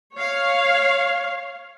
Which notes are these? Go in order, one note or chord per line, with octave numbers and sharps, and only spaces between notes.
C#5 F5